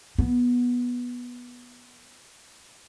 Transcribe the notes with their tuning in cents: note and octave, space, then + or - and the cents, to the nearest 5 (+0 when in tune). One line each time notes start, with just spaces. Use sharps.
B3 -10